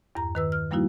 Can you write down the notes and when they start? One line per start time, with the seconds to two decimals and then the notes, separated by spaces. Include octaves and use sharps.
0.15 E2 G2 A#5
0.35 D#3 B4 E6
0.52 F6
0.71 F3 G3 A#3 D#4 E4 F#4